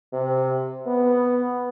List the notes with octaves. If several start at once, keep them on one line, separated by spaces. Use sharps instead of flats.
C3
B3